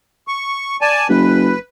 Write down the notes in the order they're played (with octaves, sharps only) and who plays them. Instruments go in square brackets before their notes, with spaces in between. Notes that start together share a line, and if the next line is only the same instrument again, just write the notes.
[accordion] C#6
D5 G#5 A5
[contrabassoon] F#1 [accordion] B4